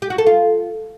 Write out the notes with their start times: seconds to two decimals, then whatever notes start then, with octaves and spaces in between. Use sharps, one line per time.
0.02 G4
0.10 F#4
0.18 A4
0.27 F4